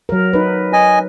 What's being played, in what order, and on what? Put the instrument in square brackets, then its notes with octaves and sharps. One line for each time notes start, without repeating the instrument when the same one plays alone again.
[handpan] F#3 A#4
D#4 B4
[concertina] D#5 G#5